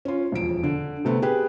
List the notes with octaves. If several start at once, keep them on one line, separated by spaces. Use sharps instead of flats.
C#4 F4
E1 F2 D7
D3
C3 A3 B3
G4 G#4 B4